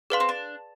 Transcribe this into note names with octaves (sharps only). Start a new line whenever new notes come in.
D4 G#4 B4 F5 C6
C4
D4